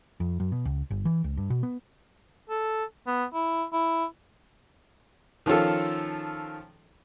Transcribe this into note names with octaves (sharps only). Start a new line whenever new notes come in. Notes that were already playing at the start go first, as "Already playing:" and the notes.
F2
F#2
B2
C#2
G1
E3
C#2
G2
B2
B3
A4
B3
E4
E4
D#3 F3 C#4 F4 A4